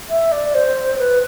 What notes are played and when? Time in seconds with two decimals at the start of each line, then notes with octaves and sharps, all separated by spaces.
0.10 E5
0.32 D5
0.55 C5
0.99 B4